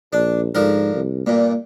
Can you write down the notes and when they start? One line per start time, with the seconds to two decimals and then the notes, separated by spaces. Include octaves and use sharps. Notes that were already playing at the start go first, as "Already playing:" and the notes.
0.13 A#1 D4
0.55 G#2 D3 F3 A#4
0.95 C2
1.26 G2 A#2 A#3